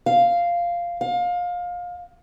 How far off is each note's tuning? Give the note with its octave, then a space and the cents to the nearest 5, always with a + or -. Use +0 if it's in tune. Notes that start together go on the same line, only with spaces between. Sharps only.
F5 -5
F5 +25